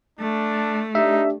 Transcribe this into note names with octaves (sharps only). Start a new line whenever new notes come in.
A3 D4
D4 D#4 G4 E5